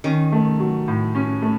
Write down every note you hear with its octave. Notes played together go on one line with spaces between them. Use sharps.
D#3 C#4
A3
F#3
A2
C#4
A3